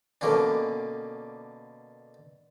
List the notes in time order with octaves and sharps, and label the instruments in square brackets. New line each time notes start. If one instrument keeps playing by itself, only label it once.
[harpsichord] B2 D3 A#3 C#4 D4